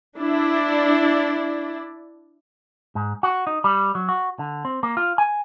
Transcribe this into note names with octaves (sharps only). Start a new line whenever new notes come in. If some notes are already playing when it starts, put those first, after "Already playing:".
D4 E4 D5
G#2
F#4
D#4
G3
F#3
F#4
D3
C4
A#3
F4
G#5